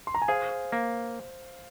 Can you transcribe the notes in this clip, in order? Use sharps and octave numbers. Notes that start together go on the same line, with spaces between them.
C6
A#5
G#5
G#4 C5 F5
A#3